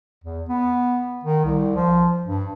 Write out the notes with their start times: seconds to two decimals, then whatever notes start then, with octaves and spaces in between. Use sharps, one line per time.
0.24 E2
0.49 B3
1.24 D#3
1.44 C2
1.75 F3
2.25 G2